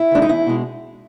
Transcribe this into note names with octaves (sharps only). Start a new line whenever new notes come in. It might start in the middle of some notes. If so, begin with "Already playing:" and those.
Already playing: E4
D#3 G#3 D4
D#4
E2 E4
B2 G#3